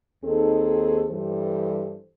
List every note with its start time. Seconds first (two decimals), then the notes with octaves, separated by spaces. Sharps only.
0.24 D#2 C4 D#4 G#4 A4
1.11 G2 E3 G3 A4 C5